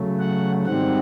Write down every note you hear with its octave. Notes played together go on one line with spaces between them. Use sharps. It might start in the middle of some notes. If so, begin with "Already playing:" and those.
Already playing: C#3 F#3 A3
F#5
G#2 D#3 G3 C4 F#5